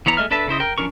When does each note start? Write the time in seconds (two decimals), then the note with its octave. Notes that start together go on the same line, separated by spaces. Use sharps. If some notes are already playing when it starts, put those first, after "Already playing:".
0.06 E3 B3 C#5 A#5
0.17 G#3 A3 D#5 E5 F6
0.31 D4 A4 B4 E5 A5
0.48 C#3 E4 C5 D#5
0.60 A#4 G5
0.78 F3 C#4 D4 A#4 C#6